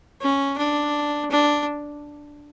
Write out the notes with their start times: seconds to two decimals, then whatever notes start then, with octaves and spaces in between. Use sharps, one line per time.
0.21 C#4
0.57 D4
1.31 D4